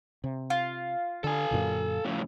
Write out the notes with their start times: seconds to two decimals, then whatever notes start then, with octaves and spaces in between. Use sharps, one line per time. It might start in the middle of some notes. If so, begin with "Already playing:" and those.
0.24 C3
0.50 F4
1.24 D3 A4 G#5
1.51 F#2 A#2 D3
2.05 F2 A2 C#3